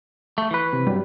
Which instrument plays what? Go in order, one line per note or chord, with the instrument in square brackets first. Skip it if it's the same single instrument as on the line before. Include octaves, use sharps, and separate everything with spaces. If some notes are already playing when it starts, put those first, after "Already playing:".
[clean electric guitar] A3 [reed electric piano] C#6
[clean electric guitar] E3 B4
[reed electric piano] C3
G2 F#3 G3